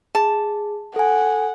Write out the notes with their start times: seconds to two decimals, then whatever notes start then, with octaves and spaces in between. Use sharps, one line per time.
0.15 G#4 A5
0.96 A4 F#5 G#5